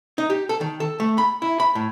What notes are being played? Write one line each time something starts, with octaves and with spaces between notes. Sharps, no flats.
D#4
G4
A4
D#3
A4
A3
B5
E4
B5
A2